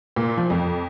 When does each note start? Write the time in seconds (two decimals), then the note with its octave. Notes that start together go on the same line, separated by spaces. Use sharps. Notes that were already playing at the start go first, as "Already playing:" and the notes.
0.16 A#2
0.37 F3
0.50 F2